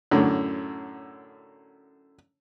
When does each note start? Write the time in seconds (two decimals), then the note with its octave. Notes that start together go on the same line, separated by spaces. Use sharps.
0.11 F#2 A2 D3